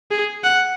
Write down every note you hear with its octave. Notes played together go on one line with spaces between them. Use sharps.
G#4
F#5